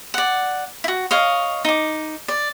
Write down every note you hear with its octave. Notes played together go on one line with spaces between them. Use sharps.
D5 F#5
E4 F#4
C#5 D#5 F5
D#4 D6
D5